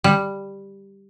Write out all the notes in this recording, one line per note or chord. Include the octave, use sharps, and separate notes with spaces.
G3